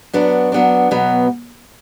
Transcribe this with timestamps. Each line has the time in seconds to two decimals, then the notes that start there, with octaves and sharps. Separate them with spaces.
0.13 F#3 B3 D4
0.52 F#3 B3 D4
0.91 B2 F#3 B3